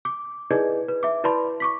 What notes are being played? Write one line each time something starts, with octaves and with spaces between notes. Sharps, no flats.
D6
D#4 E4 G#4 B4 D5 D#5
B4
E5 D6
E4 B4 D5 A5 B5 C6
C#6 D6 B6